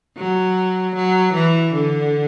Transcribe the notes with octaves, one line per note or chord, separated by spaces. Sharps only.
F#3
F#3
E3
D3